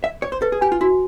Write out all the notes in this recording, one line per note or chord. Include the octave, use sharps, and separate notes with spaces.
D5 E5
C#5 D5
C5
A4 B4
G#4
G4 G#5
F4
E4 F#4